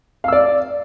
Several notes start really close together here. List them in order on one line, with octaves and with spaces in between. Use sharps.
F5 E6 D5